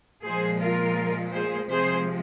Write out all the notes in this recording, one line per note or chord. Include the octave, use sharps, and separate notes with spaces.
A#2 F3 G#3 G#4 C5
F4 A#4
G#4 C5
C3 F3 G#3 G#4 C5